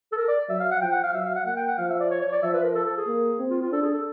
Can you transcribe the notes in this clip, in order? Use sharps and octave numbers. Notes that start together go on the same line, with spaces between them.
A4
A#4
D5
F#3 E5
F5
F#5
F3 G5
F#5
F5
F#3 E5
F5
F#5
A#3 F#5
G5
F#5
F3 F5
E5
D5
C#5
C#5
D5
F3 E5
B4
A#4
A4
A4
G#4
A#3
C4
F4
F4
D4 A4
G#4
A4